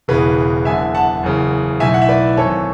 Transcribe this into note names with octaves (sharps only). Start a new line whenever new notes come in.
E1 E2 C#3 G#4 B4
F#1 E2 D3 E5 G#5
F#5 A5
F#1 E2 C#3
B1 A2 E3 E5 G#5
F#5
E5
B4 D5
G#1 F#2 E3 A4 C#5